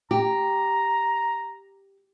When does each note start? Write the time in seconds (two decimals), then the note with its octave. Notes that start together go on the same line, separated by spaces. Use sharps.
0.11 G4 A#5